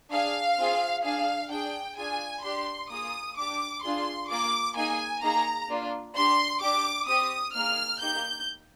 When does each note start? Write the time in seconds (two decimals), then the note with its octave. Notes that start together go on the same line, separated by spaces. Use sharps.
0.11 D4 G#4 F5
0.58 C4 F4 G#4
1.03 D4 G#4 F5
1.50 D4 G#4 G5
1.97 D4 F4 G#4 G#5
2.43 D4 G4 C6
2.89 A#3 F4 G#4 D#6
3.36 D4 G4 D6
3.83 D4 F4 G#4 C6
4.29 A#3 F4 G#4 D6
4.75 A#3 D#4 G#4 G#5
5.21 A#3 D#4 G#4 A#5
5.68 A#3 D4 F4
6.15 D4 G4 C6
6.61 D4 G4 D6
7.07 C4 G4 D#6
7.54 A#3 D#4 G#4 F6
8.00 A#3 D#4 G4 G6